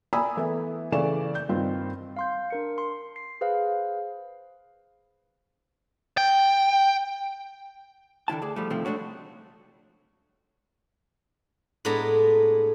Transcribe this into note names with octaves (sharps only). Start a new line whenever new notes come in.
D5 G#5 A#5 B5 D#6 E6
E3 A3 B3 E4
C#3 E3 A3 D5 C#6 E7
G6
G2 D#3 C4 F4
F5 C6 G6
D4 A#4 C#7
C6
C7
G#4 B4 C5 F5
G5
D3 D#3 E4 A5
D2 G#4 D5
F3 G3 A3
G2 C3 D#3 F3 A3
G#3 A3 C#4 D4 F#4 C#5
A2 G#3 B3 D4 A#5